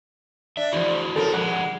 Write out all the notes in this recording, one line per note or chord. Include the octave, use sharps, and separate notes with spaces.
D4 E5
E2 D3 F3 E4 F#4 C5
F2 C#3 A4 A#4
D3 F3 G3 G#3 F#5